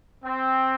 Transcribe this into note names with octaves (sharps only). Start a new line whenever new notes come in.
C4